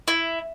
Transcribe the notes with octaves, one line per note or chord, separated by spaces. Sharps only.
E4